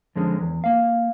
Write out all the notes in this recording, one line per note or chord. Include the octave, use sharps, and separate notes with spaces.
F2 D3 G#3 C#4
E2
A#3 F5